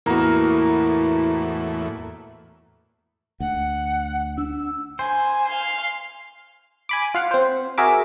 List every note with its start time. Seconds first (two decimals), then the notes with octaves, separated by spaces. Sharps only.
0.06 E2 A2 A#3 B3 E4 F#4 A#4
3.40 D2 F#5
4.38 D4 E6
4.99 C5 G#5
5.47 F5 C6
6.89 G#5 B5 D6
7.15 F4 F5 F#5
7.31 C4 C5
7.78 F#4 G#4 A#4 E5 D6